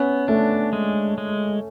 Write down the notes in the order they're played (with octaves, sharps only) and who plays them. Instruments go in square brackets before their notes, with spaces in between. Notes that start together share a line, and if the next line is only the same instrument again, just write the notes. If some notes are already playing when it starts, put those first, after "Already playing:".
Already playing: [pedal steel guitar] B3 [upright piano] C#4
[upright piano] A3 [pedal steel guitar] D4
[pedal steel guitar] G#3
G#3